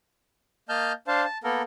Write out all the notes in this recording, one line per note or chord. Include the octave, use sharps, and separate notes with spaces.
A#3 D#5 A5 F6 G6
D4 C5 F5 A5
A5
A#3 B3 A4 A#4